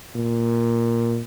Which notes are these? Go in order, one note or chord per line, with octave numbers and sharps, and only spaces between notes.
A#2